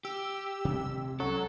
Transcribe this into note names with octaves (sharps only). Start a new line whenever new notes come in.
G4 E6
C3 G#3
C2 F#3 C#4 A4